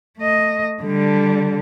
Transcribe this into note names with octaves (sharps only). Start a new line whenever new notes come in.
A3 D#5
D3 G3